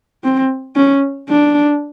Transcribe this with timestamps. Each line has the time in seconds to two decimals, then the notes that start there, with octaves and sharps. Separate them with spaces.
0.24 C4
0.76 C#4
1.29 D4